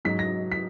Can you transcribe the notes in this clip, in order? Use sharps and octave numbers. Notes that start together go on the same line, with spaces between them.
G#2 F#3 B6
A#6
B6